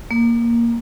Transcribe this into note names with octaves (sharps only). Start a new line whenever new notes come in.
A#3